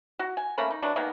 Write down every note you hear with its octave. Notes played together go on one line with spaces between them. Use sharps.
F#4
G#5
A3 A#3 C#4 B5
D#4
E3 F#3 D4
D#3 G#3 A#3 B3